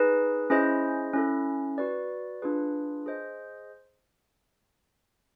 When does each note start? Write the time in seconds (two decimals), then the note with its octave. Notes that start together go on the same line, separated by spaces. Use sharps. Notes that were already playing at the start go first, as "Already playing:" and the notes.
Already playing: D#4 G#4 B4
0.50 C#4 E4 G#4 C5 D#5
1.13 C#4 E4 A4
1.78 F#4 B4 D5
2.42 D4 F4 G#4 B4
3.06 G#4 C5 D#5